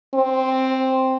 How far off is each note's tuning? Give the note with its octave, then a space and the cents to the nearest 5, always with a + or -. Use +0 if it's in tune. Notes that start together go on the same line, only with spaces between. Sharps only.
C4 +0